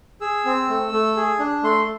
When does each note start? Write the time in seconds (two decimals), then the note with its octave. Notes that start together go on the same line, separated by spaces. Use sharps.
0.21 G#4 E6
0.45 C4
0.69 A3
0.93 A3
1.17 G#4
1.40 D4
1.63 A3 C6